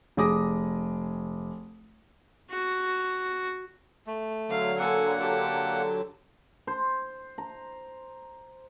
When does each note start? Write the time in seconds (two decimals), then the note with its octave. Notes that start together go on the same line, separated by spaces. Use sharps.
0.17 F1 G#4 D6 D#6 A#6
2.51 F#4
4.07 A3
4.50 D3 F#3 F5
4.79 A#3 A4 F#5 G#5
5.20 G4 A5
6.67 C5
7.38 A#5